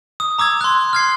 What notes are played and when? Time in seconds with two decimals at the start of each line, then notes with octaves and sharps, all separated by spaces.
0.20 D#6
0.38 A#5 D6 E6 G#6
0.61 C6 F#6
0.93 F6 G#6 C7